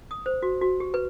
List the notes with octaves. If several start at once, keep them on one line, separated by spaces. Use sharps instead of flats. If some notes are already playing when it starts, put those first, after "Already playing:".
D#6
C5
F#4
F#4
G4
B4